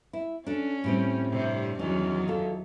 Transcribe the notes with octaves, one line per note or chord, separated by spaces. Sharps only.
E4
C#4 D4 A4
A2 G3 C4
G2 C3
E2 D#3 F#3 C#4
F4 A4